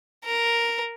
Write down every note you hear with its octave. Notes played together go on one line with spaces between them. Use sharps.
A#4